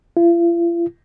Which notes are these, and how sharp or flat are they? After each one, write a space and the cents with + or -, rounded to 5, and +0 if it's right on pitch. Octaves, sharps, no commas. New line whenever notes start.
F4 -45